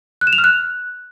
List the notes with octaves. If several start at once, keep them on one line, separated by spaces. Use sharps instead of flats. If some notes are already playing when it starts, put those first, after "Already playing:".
F#6
E7
F7
F6
F#6